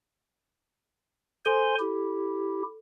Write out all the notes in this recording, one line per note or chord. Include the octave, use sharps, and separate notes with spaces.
A4 C5 G#5 C6
E4 G4